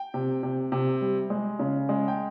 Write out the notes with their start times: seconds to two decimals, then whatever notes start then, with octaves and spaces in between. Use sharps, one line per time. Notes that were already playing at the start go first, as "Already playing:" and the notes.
Already playing: G5
0.14 C3
0.43 C3
0.72 C3
1.01 G3
1.30 G#3
1.59 C#3
1.89 G#3
2.08 G5